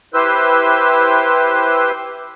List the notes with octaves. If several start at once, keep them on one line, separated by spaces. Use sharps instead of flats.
E4 G4 B4 C5 C6 E6